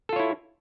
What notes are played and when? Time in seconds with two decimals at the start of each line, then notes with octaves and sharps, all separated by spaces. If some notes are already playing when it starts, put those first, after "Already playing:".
0.09 A4
0.13 F4
0.16 C#5
0.19 E4